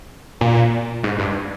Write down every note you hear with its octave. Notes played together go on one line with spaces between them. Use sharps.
A#2
G#2
G2